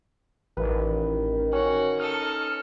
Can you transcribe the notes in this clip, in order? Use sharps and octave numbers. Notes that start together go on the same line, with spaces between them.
A1 D#3 B4
C#4 F#4
D#4 A4 F6